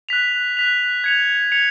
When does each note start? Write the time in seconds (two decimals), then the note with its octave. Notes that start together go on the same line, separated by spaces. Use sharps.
0.09 F#6 B6 F7
0.57 F#6 B6 F7
1.04 G#6 C#7 F7
1.52 G#6 C#7 F7